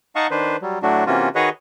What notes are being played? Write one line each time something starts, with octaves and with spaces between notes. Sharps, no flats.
D#4 D#5 F5 F#5 A5 C#6
D#3 D4 B4 C5
F#3 G3
A2 F#3 A3 D4 F#4
C3 E3 A#3 C#4 F4 F#4
D#3 F#4 G#4 B4 C#5 D#5